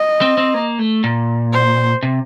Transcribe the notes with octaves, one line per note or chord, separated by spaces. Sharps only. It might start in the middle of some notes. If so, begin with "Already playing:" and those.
Already playing: D#5
C4
C4
A#3
A3
A#2
C5
C3